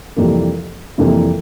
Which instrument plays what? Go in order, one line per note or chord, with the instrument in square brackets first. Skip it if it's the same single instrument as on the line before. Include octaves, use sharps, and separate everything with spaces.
[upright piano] F2 C3 E3 G3 A#3
F2 C3 E3 G3 A#3